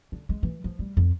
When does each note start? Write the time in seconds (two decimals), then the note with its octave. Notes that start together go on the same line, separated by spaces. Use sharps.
0.12 D3
0.29 G#3
0.43 E3
0.64 F3
0.79 G3
0.97 F2